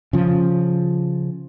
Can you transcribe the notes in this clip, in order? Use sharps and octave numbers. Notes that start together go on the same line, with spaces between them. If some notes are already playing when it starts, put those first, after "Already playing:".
C#3 F3